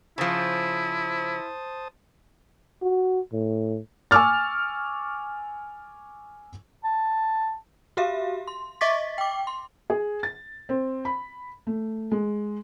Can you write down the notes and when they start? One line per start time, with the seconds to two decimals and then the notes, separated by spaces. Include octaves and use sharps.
0.18 C#3 F3 E4 C5 A5 D#6
2.83 F#4
3.33 A2
4.11 G#5 C#6 D6 E6 F6 A6
6.84 A5
7.97 F#4 G4 E5 F5
8.47 C6
8.81 D#5 E5 C#6 D6 A6 B6
9.18 G5 D6
9.47 C6
9.90 G#4
10.23 A6
10.69 C4
11.05 B5
11.67 A3
12.12 G#3